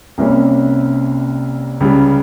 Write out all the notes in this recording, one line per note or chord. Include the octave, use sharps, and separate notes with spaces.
C2 C3 G3 A#3 C#4
C#2 C#3 G3